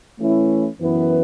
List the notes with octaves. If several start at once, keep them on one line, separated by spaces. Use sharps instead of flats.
E3 A3 C#4 E4
F#2 E3 B3 E4 B4